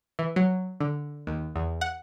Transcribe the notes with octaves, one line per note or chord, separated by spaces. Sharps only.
E3
F#3
D3
D#2
E2
F#5